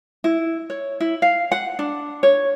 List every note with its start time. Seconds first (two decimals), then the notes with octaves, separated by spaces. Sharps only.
0.24 E4
0.70 C#5
1.00 E4
1.22 F5
1.52 F#5
1.79 D4
2.23 C#5